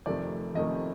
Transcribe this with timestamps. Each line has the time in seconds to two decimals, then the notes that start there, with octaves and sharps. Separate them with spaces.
0.06 F1 F2 C3 D#3 A3 D5
0.54 F1 F2 C3 D#3 A3 D#5